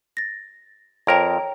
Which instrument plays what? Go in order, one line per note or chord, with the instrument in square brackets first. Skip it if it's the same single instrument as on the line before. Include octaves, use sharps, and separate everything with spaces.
[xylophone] A6 A#6
[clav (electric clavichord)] F2 A#4 [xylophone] C#5 G5 A#5